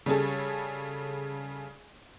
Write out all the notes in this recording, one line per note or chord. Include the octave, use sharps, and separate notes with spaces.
C#3 G3 C#4 G#4 A4